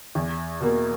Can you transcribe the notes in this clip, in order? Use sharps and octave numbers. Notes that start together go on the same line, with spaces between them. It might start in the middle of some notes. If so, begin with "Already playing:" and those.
E2
B2 A#3